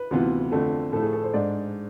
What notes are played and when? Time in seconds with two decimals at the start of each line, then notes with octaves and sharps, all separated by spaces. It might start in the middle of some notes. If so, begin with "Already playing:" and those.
Already playing: B4
0.11 D2 C3 E3 B3 F4
0.52 F2 D3 A3
0.92 A2 F3 A3 A4
1.03 G#4
1.13 A4
1.23 C5
1.33 G#2 G#3 D4 D5